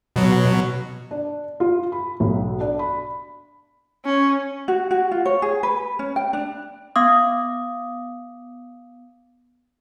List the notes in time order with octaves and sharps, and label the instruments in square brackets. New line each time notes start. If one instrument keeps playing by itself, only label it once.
[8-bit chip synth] B2 F#3
[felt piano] D4
F4
B5
B1
D4
B5
[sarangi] C#4
[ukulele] F#4
F#4
F4
C#5
G#4
B4
C#4
G5
D4
[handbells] B3 F5 D6 D#6